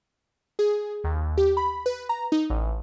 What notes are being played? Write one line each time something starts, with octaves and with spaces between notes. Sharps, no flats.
G#4
D#2
G4
B5
B4
A#5
D#4
A1